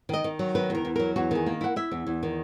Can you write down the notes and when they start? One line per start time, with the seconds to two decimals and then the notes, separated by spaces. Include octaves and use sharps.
0.09 D#3 D#5
0.24 D#3
0.39 F#3
0.55 D#3 B4
0.70 E2 A#4
0.85 E2
0.96 F#3 A#4
1.16 E2 F#4
1.31 D#3 G#4
1.46 A#3
1.61 E4 F#5
1.76 E4 E5
1.92 E2
2.07 E2
2.23 D#3